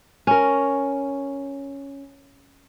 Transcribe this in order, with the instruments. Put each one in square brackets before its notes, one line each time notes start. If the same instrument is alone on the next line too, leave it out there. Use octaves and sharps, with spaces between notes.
[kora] C#4 A#4